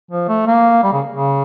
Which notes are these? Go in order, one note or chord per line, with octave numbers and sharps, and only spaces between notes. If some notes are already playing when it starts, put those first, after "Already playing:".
F3
A3
A#3
G3
C#3
C#3